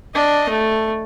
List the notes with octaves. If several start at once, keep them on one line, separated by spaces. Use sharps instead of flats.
D4 D#5
A3